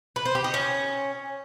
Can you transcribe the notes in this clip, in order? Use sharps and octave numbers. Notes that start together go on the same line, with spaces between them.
B4
C5
G4
D#5
C#4